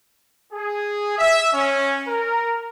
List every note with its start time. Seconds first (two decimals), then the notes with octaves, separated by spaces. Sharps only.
0.53 G#4
1.19 E5
1.54 C#4
2.08 A#4